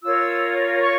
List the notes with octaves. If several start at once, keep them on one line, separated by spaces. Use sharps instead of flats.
F4 A#4 C#5 E6
C#6